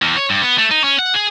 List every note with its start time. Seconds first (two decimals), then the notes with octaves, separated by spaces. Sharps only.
0.02 E2
0.17 C#5
0.30 G2
0.42 B3
0.58 A3
0.71 D#4
0.84 C#4
0.99 F#5
1.14 G#4